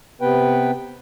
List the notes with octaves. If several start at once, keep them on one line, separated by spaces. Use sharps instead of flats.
C3 B3 B4 G5